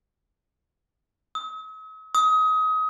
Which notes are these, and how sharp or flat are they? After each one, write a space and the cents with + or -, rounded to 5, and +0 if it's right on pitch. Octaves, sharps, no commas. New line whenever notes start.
D#6 +45
D#6 +25